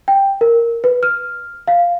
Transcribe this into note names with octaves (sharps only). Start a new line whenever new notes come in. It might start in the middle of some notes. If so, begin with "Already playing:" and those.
G5
A#4
B4
F6
F5